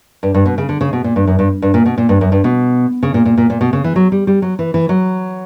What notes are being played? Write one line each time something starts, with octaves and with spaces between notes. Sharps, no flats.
G2
G2
B2
C#3
D3
C#3
B2
A#2
G2
F#2
G2
G2
A#2
B2
A#2
G2
F#2
G2
B2
C#3
A#2
A#2
A#2
A#2
B2
C#3
E3
F#3
G3
G3
F#3
E3
E3
F#3